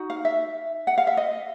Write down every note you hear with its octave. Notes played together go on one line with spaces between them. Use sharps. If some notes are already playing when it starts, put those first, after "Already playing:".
Already playing: D#4 F#4
F5
E5
F#5
F5
E5
D#5